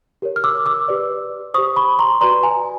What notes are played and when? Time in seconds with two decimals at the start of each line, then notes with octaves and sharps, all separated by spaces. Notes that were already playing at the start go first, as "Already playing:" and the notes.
0.22 G4 A#4 C#5
0.36 F6
0.44 D6 E6
0.66 D6 E6
0.88 G4 B4 D5
1.54 G4 C5 C#6 D#6
1.76 B5 C#6
1.99 A#5 C6
2.21 F#4 B4 D5 A#5 C6
2.43 G#5 A#5